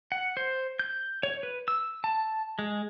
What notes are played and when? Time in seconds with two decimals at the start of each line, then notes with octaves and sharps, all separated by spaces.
0.12 F#5
0.37 C5
0.79 G6
1.23 C#5
1.43 B4
1.68 E6
2.04 A5
2.59 G#3